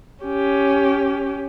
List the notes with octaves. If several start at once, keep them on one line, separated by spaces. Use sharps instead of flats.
C#4 G4